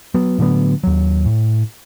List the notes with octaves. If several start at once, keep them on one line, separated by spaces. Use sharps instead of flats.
F#3 B3
A2 D3 F#3 B3
D#2 F#3
A2